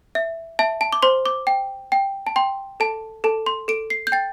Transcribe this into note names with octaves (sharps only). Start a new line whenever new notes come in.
E5
E5 A5
A5
D6
C5 C6
D6
G5
G5
A5
G5 C6
A4 A5
A4 A5
C6
A4 D7
C7
G6
G5 A6